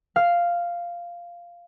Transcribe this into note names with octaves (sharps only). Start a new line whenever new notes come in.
F5 F6